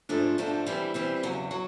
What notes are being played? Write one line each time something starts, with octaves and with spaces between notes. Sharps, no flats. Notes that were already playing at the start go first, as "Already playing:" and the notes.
G#2 F3 A3 D4
G#2 F3 A3 D4
E3 G3 C4
E3 G3 C4
E2 C#3 F#3
F#3